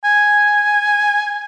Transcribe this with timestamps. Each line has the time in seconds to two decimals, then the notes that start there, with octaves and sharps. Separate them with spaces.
0.04 G#5